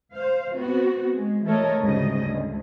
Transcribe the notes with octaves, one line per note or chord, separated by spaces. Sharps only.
C5 F5
B3 C4 F#4
G#3
E3 A3 A4 A#4 C#5 D#5
D2 G#2 C#3 G3 D#5
D2